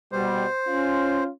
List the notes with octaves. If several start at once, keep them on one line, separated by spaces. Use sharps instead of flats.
B2 G3 C5
C#4 F4